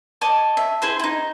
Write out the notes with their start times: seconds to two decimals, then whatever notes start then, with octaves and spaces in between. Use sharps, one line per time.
0.21 C#5 D#5 A5 D6
0.57 E5
0.82 E4 G#4 C5 C6
0.99 D#4 E4